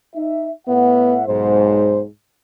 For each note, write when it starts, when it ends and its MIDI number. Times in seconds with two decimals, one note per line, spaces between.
0.16 0.50 63
0.16 0.50 76
0.68 1.25 45
0.68 1.16 59
0.68 1.25 76
0.68 1.25 78
1.27 2.05 35
1.27 2.05 44
1.27 2.00 72